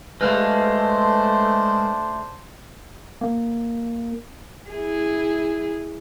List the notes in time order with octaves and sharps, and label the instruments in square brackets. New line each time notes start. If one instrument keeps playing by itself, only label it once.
[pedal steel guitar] G#3 F5 [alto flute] A3 [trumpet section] D4 C5 [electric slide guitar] B4 D5
[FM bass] A#3
[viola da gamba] E4 G#4